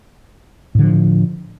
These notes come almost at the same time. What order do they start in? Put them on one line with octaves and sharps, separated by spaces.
A2 D3 F3